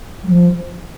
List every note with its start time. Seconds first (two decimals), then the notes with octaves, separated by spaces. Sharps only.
0.23 G3
0.29 F3